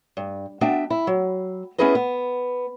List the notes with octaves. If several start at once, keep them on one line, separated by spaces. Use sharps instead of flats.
G2
B3 D4 F#4 E5 G5
E4
F#3
B3 C#4 E4 G#4 B4 D#5
B3